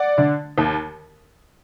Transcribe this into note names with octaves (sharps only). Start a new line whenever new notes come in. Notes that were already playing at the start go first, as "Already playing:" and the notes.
Already playing: D5 F#5
D3
D#2